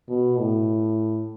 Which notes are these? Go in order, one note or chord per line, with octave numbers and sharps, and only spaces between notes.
B2
A2